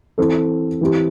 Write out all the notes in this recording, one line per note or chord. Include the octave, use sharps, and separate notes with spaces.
E3 C4 A4
E3 C4 E4 G4